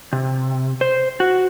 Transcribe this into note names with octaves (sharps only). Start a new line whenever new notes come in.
C3
C5
F#4